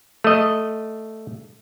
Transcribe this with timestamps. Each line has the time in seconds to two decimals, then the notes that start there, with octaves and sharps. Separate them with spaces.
0.24 A3 D#5